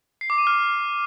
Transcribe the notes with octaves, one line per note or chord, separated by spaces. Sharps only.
C7
D6
D#7
F6